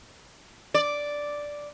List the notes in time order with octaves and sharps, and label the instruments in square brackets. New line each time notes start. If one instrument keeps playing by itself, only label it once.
[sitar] D5